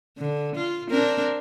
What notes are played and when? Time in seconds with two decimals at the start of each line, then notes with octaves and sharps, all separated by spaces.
0.18 D3
0.56 F4
0.90 C4 D4 A#4